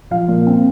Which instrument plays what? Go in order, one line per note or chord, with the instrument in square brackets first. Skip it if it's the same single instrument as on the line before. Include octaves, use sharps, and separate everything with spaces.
[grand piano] F3 F5
A#2
C4